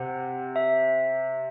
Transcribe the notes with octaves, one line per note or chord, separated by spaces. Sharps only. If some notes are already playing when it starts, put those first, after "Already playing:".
Already playing: C3 F#5
E5